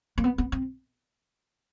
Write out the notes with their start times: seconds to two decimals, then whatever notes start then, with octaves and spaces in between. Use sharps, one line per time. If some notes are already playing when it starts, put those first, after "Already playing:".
0.18 A#3
0.24 B3
0.38 B3
0.52 C4